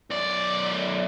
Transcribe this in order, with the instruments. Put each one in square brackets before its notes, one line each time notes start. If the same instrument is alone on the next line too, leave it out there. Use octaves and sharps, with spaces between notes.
[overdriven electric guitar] B1 D5